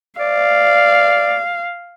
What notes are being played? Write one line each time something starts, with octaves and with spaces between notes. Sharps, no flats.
D5 F5